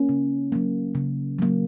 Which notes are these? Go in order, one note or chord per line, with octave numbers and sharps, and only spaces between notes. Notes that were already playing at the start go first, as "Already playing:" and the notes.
Already playing: A#3 C#4
C#3
F#3 A#3
C#3
F#3 A#3